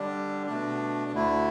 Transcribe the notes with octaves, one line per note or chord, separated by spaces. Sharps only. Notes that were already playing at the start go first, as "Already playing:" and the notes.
Already playing: D3 G3 D4
B2 A3 D4
D2 D3 A3 E4